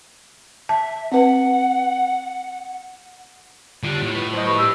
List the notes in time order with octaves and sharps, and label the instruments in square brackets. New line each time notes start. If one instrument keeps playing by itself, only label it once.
[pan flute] E5 [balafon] A5
[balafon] C4 B4 [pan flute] F#5
[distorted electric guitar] D3 [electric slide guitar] G3 F4 G4
[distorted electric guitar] A2
[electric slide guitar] F#4 B4
[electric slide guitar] F#3 [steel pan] C5 D#5
[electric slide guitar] F3 G3 [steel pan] B4 [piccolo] C#6
[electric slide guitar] D4 G4 [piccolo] E6